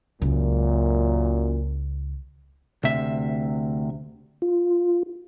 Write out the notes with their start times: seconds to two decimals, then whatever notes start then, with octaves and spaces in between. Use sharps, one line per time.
0.22 C#2 F#2 A#2
2.84 D2 C3 E5
4.42 F4